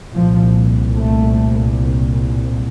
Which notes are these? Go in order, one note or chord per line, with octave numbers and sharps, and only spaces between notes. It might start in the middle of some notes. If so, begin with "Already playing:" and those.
C2 A#2 F3
A3